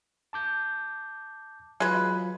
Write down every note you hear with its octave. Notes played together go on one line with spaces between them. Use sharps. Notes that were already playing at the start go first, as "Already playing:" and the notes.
A5 D6 G6
F#3 G#3 F4 B4